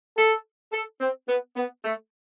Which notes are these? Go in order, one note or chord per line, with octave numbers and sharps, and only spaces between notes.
A4
A4
C4
B3
B3
A3